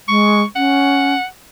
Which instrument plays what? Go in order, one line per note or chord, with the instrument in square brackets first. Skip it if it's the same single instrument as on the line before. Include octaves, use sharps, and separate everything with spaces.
[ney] G#3 [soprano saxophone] C#6
[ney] C#4 [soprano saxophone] F#5